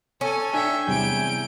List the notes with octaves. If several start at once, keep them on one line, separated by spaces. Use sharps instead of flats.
C#4 A4 G#5
D4 E5 G5 G#5
E2 C3 G3 G6 D7